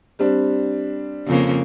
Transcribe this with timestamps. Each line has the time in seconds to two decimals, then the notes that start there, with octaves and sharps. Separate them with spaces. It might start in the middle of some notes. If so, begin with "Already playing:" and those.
0.19 G3 C4 D4
1.27 F2 C#3 A#3